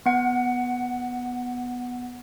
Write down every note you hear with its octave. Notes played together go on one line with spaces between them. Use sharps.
B3 F#5